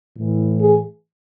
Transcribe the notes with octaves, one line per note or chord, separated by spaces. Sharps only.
A2 E3
G#4